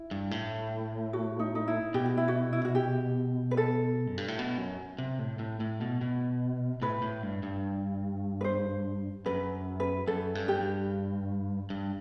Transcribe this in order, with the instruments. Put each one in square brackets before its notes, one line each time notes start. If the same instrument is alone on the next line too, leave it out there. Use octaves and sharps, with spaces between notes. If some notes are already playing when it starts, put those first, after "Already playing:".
Already playing: [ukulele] E4
[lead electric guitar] G2
A2
[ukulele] F#4
D#4
D#4
E4
[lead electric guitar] B2 [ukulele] G4
[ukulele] F#4
E4
F#4
E4
F#4
G4
B4
A4
[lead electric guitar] F#2
G2
A2
B2
F#2
C3
A2
A2
A2
B2
B2
[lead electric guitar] A2 [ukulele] B4
[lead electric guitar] A2
G2
G2
[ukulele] B4
C5
[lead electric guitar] F#2 [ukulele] B4
[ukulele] B4
[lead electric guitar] F#2 [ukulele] A4
[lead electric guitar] G2
[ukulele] G4
[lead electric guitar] G2
G2